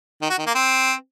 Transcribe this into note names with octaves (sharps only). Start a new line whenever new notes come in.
D#3
F#4
D#3
A#3
C4